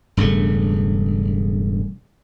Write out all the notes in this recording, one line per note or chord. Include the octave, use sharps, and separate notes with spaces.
E1 G2 C#3 A3